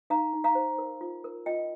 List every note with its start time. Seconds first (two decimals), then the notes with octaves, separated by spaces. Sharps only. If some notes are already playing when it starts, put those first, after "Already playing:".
0.10 D#4 F5 A#5
0.33 D#4
0.44 F5 A#5
0.55 C5
0.78 A#4
1.01 F4
1.24 A#4
1.46 F4 D#5 G5